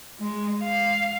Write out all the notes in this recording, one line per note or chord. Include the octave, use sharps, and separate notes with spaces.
G#3
F5